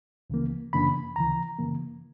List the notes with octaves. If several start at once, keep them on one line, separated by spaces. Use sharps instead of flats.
C#2 C#3 E3 A#3
F#2 C#3 E3 A#3 D4 B5
D2 C#3 E3 A#5
F#2 C#3 E3 A#3